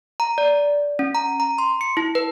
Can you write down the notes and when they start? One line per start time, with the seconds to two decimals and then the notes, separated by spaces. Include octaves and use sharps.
0.20 A#5
0.38 D5
0.99 C#4
1.15 A#5
1.40 A#5
1.58 C6
1.81 C#7
1.97 E4
2.15 B4